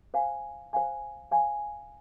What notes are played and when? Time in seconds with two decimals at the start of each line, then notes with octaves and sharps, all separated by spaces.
0.14 C5 F5 G#5
0.73 C5 F5 G#5
1.31 C5 F5 G#5